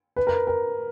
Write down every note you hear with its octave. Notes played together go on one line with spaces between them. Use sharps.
B4
A#4
A#4